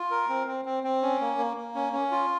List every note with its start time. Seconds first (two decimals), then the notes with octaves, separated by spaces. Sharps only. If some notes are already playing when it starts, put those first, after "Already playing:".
Already playing: F4
0.11 A#4
0.29 C4
0.47 C4
0.65 C4
0.84 C4
1.02 C#4
1.21 A#3
1.38 A#3
1.57 A#3
1.75 C#4
1.93 C#4
2.11 F4